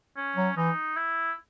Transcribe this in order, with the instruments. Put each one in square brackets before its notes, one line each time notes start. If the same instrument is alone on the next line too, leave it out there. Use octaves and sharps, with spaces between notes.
[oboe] C#4
[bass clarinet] F#3
[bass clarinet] E3 [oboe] D#4
[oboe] E4